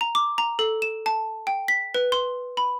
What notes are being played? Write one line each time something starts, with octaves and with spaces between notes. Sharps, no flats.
A#5
D6
A#5
A4
E7
A5
G5
B6
B4
C6
B5